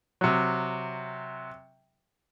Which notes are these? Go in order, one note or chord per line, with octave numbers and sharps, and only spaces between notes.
C3 F#3